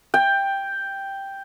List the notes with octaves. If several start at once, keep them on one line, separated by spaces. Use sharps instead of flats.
G5